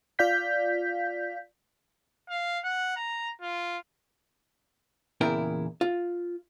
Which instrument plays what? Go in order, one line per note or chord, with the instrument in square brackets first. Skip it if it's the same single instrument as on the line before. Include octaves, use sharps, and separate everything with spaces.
[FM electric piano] F4 D5 F5 G6 B6
[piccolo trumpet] F5
F#5
A#5
F4
[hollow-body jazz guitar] E2 A#2 C#3 E4 A#4 G5
F4